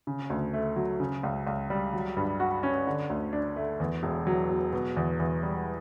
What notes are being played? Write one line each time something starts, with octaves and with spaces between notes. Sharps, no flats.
C#3
D2
A3
F#3
C#3
C#2
C#2
G3
F#3
G2
F#4
C#4
D3
D2
D4
A3
E2
E1
F#3
B2
B2
E2
E2
G3